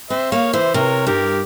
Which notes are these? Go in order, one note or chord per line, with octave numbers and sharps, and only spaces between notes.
C4 C5 E5
A#3 C#5 F5
E3 C5 E5
C3 A#4 C#5
G2 G4 A#4